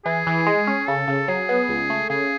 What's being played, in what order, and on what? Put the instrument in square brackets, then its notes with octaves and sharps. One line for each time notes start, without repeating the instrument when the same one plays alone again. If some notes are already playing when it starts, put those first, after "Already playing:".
[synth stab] E3 [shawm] G#4
[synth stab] E3
G#3
C#4
[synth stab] C#3 [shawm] A4
[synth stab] C#3
[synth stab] F#3 [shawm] G#4
[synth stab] B3
C#2
A3
[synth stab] C#3 [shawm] G#4